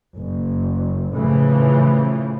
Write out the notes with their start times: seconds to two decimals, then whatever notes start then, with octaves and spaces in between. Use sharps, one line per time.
0.17 F#1
1.14 A2 C#3 E3 F3